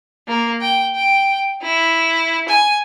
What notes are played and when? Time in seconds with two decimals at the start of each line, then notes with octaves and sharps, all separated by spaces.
0.28 A#3
0.61 G5
0.96 G5
1.62 E4
2.48 G#5